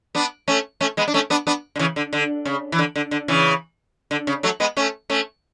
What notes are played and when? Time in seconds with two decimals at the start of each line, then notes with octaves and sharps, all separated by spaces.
0.15 B3 D4
0.48 A3 C#4
0.81 A3 C#4
0.97 G#3 B3
1.08 D4
1.14 A3 C#4
1.30 B3 D4
1.47 B3 D4
1.76 D3
1.79 C#3 E3
1.96 D3
2.13 D3
2.45 C#3
2.72 E3
2.79 D3
2.96 D3
3.11 D3
3.28 C#3 E3
4.11 D3
4.27 C#3
4.43 F#3 A3
4.60 G#3 B3
4.77 A3 C#4
5.10 A3 C#4